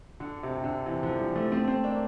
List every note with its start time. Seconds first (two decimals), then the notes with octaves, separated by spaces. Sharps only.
0.20 D3
0.43 C3
0.57 C3
0.64 D3
0.86 C3 E3
1.03 D3 F3
1.19 E3 G3
1.35 F3 A3
1.52 A3 C4
1.68 A3 C4
1.84 A#3 D4